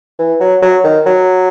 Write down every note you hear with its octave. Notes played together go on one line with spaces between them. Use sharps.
E3
F#3
F#3
D#3
F#3